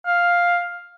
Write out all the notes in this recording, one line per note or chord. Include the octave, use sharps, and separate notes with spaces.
F5